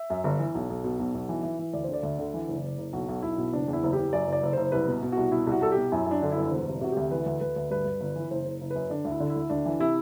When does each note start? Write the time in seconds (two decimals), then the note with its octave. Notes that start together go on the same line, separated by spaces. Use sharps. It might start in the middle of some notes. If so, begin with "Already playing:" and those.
Already playing: E5
0.10 F#2
0.24 G1
0.39 E3
0.55 B1
0.70 B1
0.84 B2
0.99 B1
1.15 B1
1.29 E3
1.43 E3
1.59 E3
1.73 D2 D5
1.84 D3 C5
1.93 D5
2.03 D2
2.19 D3
2.34 E3
2.48 F#1
2.63 F#1
2.78 F#1
2.93 B1 F#4
3.09 B1
3.22 B1 E4
3.38 B2
3.53 F#1 D4
3.68 E2
3.73 E4
3.83 F#1
3.93 G4
3.98 F#1
4.13 F#2 D5
4.27 F#1
4.32 D5
4.43 F#1
4.53 F#1 C5
4.72 C2 B4
4.87 B2
5.02 B2
5.12 C2 F#4
5.32 B2 E4
5.47 C2 F#4
5.61 C2 A4
5.72 B2 G4
5.92 F#2 E4
6.06 F#2 D4
6.22 D3
6.32 G1 E4
6.52 E1 C5
6.67 C3
6.81 C3 F#4
6.92 D2 G4
7.11 E3 B4
7.26 D2
7.41 D2 B4
7.56 D2
7.70 G2 B4
7.86 G2
8.01 G1
8.16 E3
8.31 F#1 C5
8.45 F#1
8.61 F#1
8.71 F#2 B4
8.90 D3 D4
9.05 D2
9.10 E4
9.20 D3
9.30 E4
9.36 D2
9.50 D2 D4
9.66 E3
9.80 C3 E4